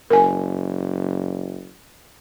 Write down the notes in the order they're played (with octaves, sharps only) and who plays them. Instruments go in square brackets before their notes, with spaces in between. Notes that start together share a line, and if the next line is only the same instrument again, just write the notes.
[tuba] F#1 [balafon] A#4 G#5